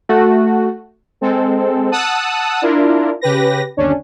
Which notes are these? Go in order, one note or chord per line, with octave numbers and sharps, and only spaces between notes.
A3 F#4
G#3 C4 A4
F#5 A5 D#6 E6 F#6
D4 E4 F4 A#4
C#3 G4 B4 A#6
G1 D#2 C#4 D4